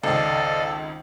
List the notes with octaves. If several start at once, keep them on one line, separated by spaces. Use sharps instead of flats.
G#1 C#2 A4 D5 D#5 F5